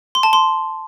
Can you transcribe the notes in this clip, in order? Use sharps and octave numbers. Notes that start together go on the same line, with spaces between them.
C6
A5
C6